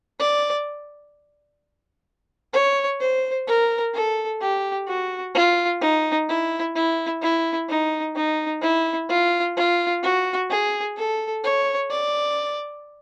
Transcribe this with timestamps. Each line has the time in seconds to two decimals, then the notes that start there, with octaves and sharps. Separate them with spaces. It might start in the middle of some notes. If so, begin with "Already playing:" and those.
0.19 D5
2.53 C#5
3.00 C5
3.47 A#4
3.94 A4
4.41 G4
4.88 F#4
5.34 F4
5.81 D#4
6.29 E4
6.75 E4
7.22 E4
7.69 D#4
8.16 D#4
8.62 E4
9.09 F4
9.57 F4
10.03 F#4
10.50 G#4
10.97 A4
11.44 C#5
11.91 D5